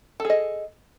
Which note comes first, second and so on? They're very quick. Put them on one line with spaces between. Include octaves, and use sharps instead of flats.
A4 G#4 D#5